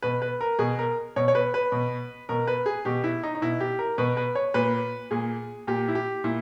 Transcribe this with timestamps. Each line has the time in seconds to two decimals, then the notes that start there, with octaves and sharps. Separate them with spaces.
0.02 B2 B4
0.22 B4
0.41 A#4
0.59 B2 G#4
0.79 A#4
1.16 B2 C#5
1.28 C#5
1.35 B4
1.54 B4
1.72 B2
2.29 B2 A#4
2.47 B4
2.66 G#4
2.85 B2 G4
3.04 E4
3.23 D#4
3.35 D#4
3.42 B2 E4
3.60 G4
3.79 A#4
3.98 B2 B4
4.17 B4
4.35 C#5
4.54 A#2 B4
5.11 A#2 G#4
5.67 A#2 G4
5.88 E4
5.95 G4
6.24 A#2 E4